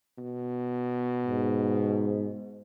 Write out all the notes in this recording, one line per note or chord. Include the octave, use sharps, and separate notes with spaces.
B2
G#2